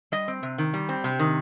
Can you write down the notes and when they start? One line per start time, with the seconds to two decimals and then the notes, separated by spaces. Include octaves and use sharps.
0.12 G3 D#5
0.28 C4
0.43 C3
0.58 D#3
0.74 G3
0.89 C4
1.04 C3
1.19 D#3